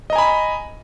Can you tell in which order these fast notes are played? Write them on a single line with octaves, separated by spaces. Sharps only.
D#5 A#5 G#5 B5